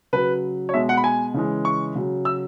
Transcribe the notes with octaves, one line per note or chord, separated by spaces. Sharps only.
C#3 F#3 B4
C#5
B2 G#3 E5
F#5
B5
G#5
C#3 E3 G#3
C#6
C#3 F#3
E6